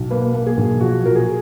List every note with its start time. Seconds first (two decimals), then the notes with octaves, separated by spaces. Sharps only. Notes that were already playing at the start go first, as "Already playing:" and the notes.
Already playing: B1
0.10 A#3 B4
0.34 A#3
0.46 G#4
0.57 B1
0.80 F3 F#4
1.04 A#2 A#4
1.15 G#4